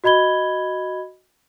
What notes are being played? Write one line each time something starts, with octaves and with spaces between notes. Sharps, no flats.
F#4 D#5 B5 G#6 G7